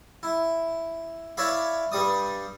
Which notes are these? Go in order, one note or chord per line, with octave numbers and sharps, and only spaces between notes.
E4
E4 C#5 D5 E5 F5 B5
G2 G3 D5 D#6